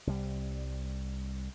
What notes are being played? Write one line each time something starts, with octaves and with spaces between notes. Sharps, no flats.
C2 G3